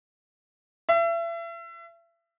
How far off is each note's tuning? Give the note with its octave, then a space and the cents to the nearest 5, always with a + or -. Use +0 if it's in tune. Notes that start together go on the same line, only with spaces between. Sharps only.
E5 +35